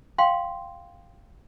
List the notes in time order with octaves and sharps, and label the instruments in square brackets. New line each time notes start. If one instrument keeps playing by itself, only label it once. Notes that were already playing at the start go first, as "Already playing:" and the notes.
[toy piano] F5 G5 C6